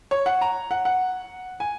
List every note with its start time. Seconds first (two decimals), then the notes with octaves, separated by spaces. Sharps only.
0.11 C#5
0.26 F#5
0.41 A#5
0.71 F#5
0.85 F#5
1.60 G#5